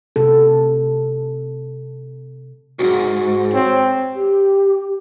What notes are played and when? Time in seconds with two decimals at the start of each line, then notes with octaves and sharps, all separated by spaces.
0.16 C3 A4
2.79 B1 G#2 F#4
3.54 C4 C#5
4.15 G4